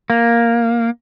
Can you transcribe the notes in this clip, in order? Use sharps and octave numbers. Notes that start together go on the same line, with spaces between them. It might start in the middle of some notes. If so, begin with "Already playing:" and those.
A#3